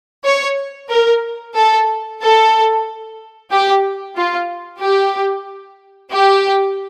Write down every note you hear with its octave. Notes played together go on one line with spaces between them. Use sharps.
C#5
A#4
A4
A4
G4
F4
G4
G4